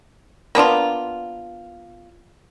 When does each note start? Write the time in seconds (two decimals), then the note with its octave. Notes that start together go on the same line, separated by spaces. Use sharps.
0.55 A#3 B3 D4 F4